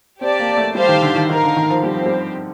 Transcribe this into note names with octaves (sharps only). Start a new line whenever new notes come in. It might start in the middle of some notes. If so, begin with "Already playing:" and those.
C4 G4 D5 A5
A#3
A3
G3 G4 C5 F5 A5
D#3
D3
D#3
D#3 D#4 A#4 F5
D3
D#3
F3
G3 C4 G4 C5
F3
G3